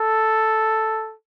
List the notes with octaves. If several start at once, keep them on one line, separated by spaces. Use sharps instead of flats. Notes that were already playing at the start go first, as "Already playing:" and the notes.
Already playing: A4